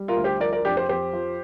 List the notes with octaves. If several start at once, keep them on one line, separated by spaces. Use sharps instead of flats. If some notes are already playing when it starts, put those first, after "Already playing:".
Already playing: G3
F4 A#4
D2
G4 C5
F3 A#4 D5
A#4 D5
F2 D4 G4
G4 C5
F2 G4 C5
F3